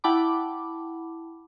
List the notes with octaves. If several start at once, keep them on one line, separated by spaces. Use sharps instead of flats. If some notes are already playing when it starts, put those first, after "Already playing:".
E4 F#5 G5 A5 B5 D6